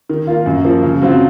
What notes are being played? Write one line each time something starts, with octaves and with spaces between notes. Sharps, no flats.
D#3
A#3 F4
F#2
F3 A#3
C#3
F#3 C4 F4